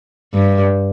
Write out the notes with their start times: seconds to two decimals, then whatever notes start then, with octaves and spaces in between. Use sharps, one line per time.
0.34 G2